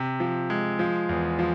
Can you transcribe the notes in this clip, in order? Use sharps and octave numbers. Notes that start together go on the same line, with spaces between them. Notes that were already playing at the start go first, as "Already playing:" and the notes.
Already playing: C3
F3
G#3
F3
E2
F3